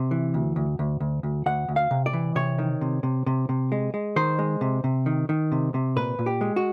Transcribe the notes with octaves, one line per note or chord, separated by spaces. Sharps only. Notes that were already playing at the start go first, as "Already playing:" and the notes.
Already playing: C3
E3
D2
D2
D2
D2
D2
D2 F#5
D2
F5
C3
D5
E3
C3 C#5
D#3
C3
C3
C3
C3
G#3
G#3
D#3 C5
G#3
C3
C3
D#3
D#3
C3
C3
A#2 B4
A#2
G4
G#3
F#4